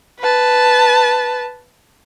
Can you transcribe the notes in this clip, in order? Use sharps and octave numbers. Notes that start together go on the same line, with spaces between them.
B4 A5